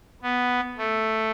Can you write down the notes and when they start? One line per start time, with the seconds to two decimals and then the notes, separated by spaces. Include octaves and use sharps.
0.22 B3
0.77 A3